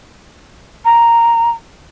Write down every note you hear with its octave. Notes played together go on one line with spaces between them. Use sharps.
A#5